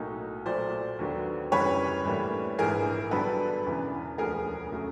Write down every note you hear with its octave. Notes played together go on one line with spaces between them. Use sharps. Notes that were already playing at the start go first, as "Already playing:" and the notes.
Already playing: B1 A2 F#3 A#3 D#4
A#2 F#3 A3 C5 D5
D#2 D3 F#3 B3 D4
F#2 C#3 E3 G3 B4 C#5
A2 E3 G3 A#3 D4
A#1 G#2 E3 G#4 A#4
G2 D3 F#3 B3 D4 A4 B4
E1 E2 C#3 E3
E1 D2 D3 F3 G#4 A#4
C#3 F#3 A3